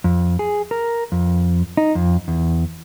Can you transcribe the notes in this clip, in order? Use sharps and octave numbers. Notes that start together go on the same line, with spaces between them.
F2
G#4
A#4
F2
D#4
F2
E2